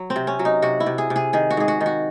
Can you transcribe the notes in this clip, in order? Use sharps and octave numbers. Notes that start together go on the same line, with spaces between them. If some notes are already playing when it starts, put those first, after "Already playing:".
Already playing: F#3
C4
C3
C#4
F#3
D#4
C3 F#4
E4
C3
G#4
C3
G#4
D#3 G#4
F#4
G#2 G#4
F#4
D#3
F#4